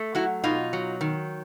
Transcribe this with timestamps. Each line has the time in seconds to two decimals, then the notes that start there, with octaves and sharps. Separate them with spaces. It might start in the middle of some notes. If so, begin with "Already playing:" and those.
Already playing: A3
0.15 F#3 E4 F#4
0.44 B2 D#4 F4
0.73 F#3
1.01 D#3